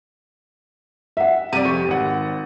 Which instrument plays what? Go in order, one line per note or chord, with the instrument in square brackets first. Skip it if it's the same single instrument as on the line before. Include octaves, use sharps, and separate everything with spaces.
[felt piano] E5 F#5
[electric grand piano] C3 G3 D5 [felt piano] D#7
[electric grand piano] F2 G4 C#6
G#1 F#5